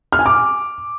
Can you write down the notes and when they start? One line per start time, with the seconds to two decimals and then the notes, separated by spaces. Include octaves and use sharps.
0.13 F6
0.19 G#5
0.26 D6